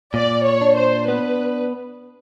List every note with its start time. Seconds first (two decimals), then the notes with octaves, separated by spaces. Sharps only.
0.14 A#2 D5
0.45 C#5
0.61 D4
0.77 C5
1.08 B3 B4